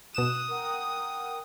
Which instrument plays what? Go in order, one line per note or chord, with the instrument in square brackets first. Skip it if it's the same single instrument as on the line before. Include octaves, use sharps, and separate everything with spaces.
[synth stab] B2 E7 [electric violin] D#6 [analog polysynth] F#6
[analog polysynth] A#4 F#5 G5